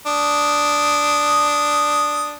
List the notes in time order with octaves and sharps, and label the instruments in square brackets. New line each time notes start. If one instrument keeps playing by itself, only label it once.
[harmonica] D4 D#6